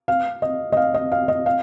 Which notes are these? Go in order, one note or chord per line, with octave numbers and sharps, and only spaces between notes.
F5
D#5
D#5
F5
D#5
F5
D#5
F5